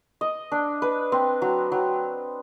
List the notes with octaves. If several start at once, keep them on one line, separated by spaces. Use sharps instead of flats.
D#5
D4
B4
C4
F#3
F#3